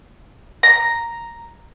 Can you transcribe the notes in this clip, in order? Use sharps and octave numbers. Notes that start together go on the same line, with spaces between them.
A#5